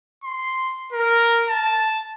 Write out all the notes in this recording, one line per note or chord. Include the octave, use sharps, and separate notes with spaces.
C6
A#4
A5